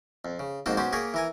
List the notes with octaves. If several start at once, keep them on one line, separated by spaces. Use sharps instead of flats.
F2
C#3
F2 G#2 A#3 F#4 G5 A5
B3 C#4 F#4 G4 C5
A#3 G4 G#4 A#4 C#5
E3 A#4 G#5